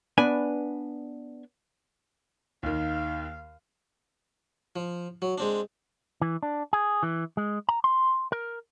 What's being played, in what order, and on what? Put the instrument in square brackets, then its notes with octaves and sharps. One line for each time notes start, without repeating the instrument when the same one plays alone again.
[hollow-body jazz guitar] B3 D4 B4 G#5
[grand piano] D#2 D#3 [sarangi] F5
[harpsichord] F3
F#3
G#3 C4 D4
[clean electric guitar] E3
D4
G#4
E3
G#3
A#5
C6
A#4